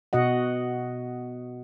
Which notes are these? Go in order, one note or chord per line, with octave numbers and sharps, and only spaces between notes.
B2 F#4 D#5 F#5